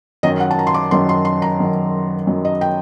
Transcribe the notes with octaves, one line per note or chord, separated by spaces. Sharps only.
F#2 D#3 F#3 D#5
F#5
A5
A#5
C6
D6
F#2 D#3 F#3 C6
C6
C6
A#5
F#2 D#3 F#3
F#2 D#3 F#3
D#5
G5